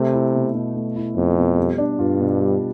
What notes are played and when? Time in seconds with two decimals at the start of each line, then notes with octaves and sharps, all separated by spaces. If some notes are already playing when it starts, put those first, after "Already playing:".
Already playing: C3 A3
0.13 E4
0.34 B2
0.55 B2
0.75 A3
0.96 E4
1.16 F2 B2
1.37 B2
1.58 G3
1.78 D4
1.99 G2 F4
2.19 B2
2.40 G3